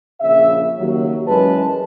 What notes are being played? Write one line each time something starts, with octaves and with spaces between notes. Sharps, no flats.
A#1 C#3 E5
D#2 C#3 F#3
F#2 E3 G#3 B4 A5